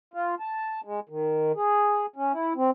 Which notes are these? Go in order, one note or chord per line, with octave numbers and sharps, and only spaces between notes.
F4
A5
G#3
D#3
G#4
C#4
E4
C4